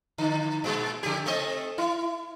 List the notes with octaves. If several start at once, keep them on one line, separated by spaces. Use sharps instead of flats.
D3
A#2 G#3
C#3 G4
A3 C4 D#5
E4